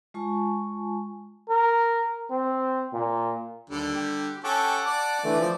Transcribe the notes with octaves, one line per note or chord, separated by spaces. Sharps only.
G#3 F4 G#5 A5 C#6
A#4
C4
A#2
D#2 D3 G3
G4
C#4 G4 A4 F#5 A5 D6
D5
D3 E3 A3
F3